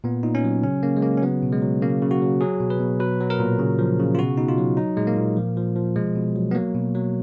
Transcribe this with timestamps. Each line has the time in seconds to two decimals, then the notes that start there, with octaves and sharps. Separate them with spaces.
0.04 A#2 B3
0.23 A#2 D#4
0.35 C#4
0.44 F#3
0.63 C#3 C#4
0.83 C#3 A#3
0.97 G#3
1.03 C#3 A#3
1.17 C#4
1.22 F#3 B3
1.43 B2
1.52 G#3
1.62 F#3
1.82 C#3 A#3
2.02 C#3
2.11 F#4
2.22 F#3
2.41 F#3 G#4
2.60 B2
2.70 B4
2.80 B2
3.00 F#3 B4
3.21 F#3
3.30 A#4
3.40 A#2
3.59 C#3
3.79 F3
4.00 C#3
4.15 F4
4.19 B2 F#4
4.37 B2 D#4
4.49 F4
4.58 F#3
4.77 F#3 D#4
4.97 A#2 G#3
5.07 A#3
5.17 A#2
5.37 F3
5.57 F3
5.76 F3
5.96 B2 G#3
6.15 B2
6.36 F#3
6.51 B3
6.55 F#3 A#3
6.74 B2
6.95 F#3